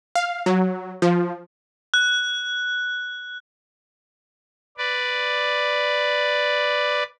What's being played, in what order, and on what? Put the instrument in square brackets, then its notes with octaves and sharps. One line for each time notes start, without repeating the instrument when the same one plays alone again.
[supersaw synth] F5
F#3
F3
[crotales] F#6
[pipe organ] B4 D5